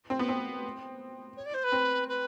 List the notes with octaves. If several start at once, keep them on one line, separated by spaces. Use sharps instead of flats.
C4
B3
C4
C#5
D5
C5
B4
C4
B4